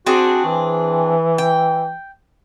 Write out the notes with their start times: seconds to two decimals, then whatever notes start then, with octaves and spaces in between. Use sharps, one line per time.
0.06 C4 D4 F#4 G#4
0.45 E3
1.38 G5